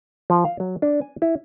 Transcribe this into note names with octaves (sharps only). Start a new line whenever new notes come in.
F3
F5
F#3
D4
G#5
E4